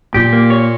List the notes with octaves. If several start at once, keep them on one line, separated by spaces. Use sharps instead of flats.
A#2 G4
A#3
C#5